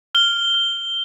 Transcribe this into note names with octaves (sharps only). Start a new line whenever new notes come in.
F6 G7
F6